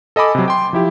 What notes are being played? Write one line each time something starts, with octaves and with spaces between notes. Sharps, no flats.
A4 D#5 G#5 B5 D6
C3 F#3
G5 C6
F3 E4 G4